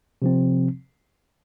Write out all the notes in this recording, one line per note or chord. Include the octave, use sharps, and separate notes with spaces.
C3 F3 C4